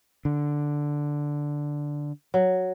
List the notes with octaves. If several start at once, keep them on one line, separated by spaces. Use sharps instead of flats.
D3
F#3